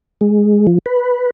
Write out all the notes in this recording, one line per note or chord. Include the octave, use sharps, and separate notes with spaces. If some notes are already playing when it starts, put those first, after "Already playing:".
G#3
F3
B4